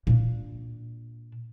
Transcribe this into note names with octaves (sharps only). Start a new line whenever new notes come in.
A#2 D4